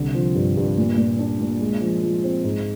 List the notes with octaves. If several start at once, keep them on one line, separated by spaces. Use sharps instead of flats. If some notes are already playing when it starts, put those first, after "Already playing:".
Already playing: C2 D3
F3
G2
G2
A#2
A#2
D4
A#2
G#3
F3
F3
C4
G#2